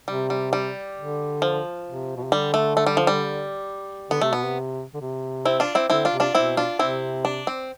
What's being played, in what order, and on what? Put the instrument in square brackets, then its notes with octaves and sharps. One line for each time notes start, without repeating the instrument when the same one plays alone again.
[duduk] C3 [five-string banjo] G3
[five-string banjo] G3
G3
[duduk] D3
[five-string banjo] F3
[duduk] C3
B2
C3
[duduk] D3 [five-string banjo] G3
[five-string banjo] A3
A3
G3
F3
G3
[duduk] D3 [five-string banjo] B3
[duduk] C3 [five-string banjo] A3
[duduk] B2 [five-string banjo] B3
[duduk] C3
D3
C3
[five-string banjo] C4 E4
D4 F4
C4 E4
[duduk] D3 [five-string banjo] C4 E4
[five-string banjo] D4 F4
[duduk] C3
[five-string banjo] D4 F4
[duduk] B2 [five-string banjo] C4 E4
[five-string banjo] D4 F4
[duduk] C3 [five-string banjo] C4 E4
[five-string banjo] D4
C4